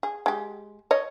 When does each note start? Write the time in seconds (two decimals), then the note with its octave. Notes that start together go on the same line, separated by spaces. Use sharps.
0.03 G#4
0.26 G#3 G4
0.91 C#5 D#5